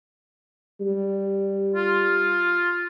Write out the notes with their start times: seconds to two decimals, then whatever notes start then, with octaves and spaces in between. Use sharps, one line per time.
0.81 G3
1.74 F4